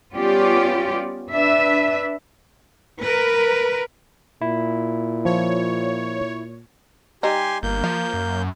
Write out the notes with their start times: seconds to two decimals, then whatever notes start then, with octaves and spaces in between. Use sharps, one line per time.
0.14 G3 B3 C#4 F4 G4 D5
1.31 D4 B4 E5
2.98 A#4 B4
4.41 A#2 E4
5.25 F3 C#5
7.23 G3 D#4 G4 G#5 C6
7.63 G1 A#3 G6
7.84 F3 F5
8.14 F#2